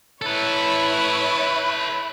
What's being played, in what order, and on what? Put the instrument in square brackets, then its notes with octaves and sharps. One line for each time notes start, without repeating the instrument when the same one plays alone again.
[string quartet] E4 C#5 [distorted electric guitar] A4 B4